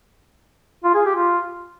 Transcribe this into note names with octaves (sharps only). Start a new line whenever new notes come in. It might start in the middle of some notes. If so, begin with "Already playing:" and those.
F4
G#4
G4
F4